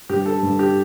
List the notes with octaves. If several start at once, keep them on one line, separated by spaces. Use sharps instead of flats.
G2 G4
A4
G2
G4